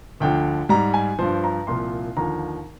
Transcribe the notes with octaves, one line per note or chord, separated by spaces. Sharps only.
D2 D3 F3 G5
G#2 G3 A#5
G#5
G2 F3 C5
A#5
C2 A#2 F3 C6
D#2 D3 F3 A#5